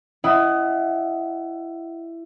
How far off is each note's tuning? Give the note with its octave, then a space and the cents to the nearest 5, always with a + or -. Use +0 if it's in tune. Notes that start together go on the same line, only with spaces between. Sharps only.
E4 +15 D#5 +0 F#5 +30